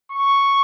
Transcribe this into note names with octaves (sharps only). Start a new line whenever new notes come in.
C#6